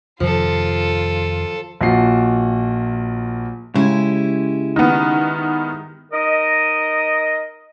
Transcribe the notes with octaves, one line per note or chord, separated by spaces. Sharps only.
F2 C3 D#3 F3 F4 A4
A#1 F4 F#4 C7
C#3 G#3 E4 G4
D#3 B3
D#4 A#4 D#5